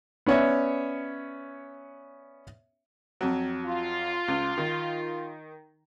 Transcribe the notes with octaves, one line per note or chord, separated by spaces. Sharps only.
B3 C#4 C#5 D5 E5
F2 F#3
F4
C#2
D#3